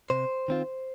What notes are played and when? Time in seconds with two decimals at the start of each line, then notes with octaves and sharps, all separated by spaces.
0.10 C3 C5
0.48 D#3 C4 F4